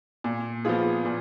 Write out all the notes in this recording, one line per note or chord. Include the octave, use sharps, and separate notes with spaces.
A#2
F3 B3 F4 G#4
A#2